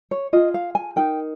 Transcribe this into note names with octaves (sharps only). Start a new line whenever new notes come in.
C#5
F4 G#4 D#5
F5
G#5
D#4 A#4 G5